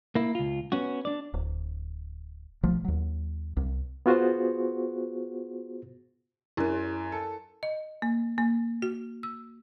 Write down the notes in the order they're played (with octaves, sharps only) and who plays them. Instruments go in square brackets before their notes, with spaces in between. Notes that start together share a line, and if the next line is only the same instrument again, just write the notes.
[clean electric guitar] A#3 E4
C#2 F4
B3 C#4 F#4
D4 D5
[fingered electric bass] D1
B1 F3 F#3 A3
D#2 F#3
C2
[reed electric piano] B3 F4 F#4 G#4 C5
[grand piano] F#2 [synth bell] E4 A#4
[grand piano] A4
[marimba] D#5
A#3
A#3
F#4
E6